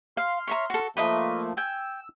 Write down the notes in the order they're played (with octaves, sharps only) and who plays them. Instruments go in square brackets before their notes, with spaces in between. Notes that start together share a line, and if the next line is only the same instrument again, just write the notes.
[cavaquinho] F5 [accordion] C6 F6
[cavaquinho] C#5 E5 A#5
F#4 A4
[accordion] F3 A3 A#3 [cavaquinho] B4 D#5 E5
[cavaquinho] G5 G#5 [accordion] E6